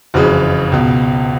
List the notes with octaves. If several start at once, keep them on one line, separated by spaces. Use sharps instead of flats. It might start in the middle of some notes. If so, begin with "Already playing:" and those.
F#1 F2 C#3 E3 F#4
C#2 B2